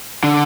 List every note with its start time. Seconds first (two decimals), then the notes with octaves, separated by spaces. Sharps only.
0.23 D3